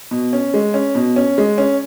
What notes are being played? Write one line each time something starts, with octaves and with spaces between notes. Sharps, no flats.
B2
C#4
G#3
C#4
B2
C#4
G#3
C#4